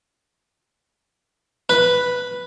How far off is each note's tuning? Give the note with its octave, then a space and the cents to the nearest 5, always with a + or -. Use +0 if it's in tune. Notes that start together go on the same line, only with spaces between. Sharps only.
B4 +0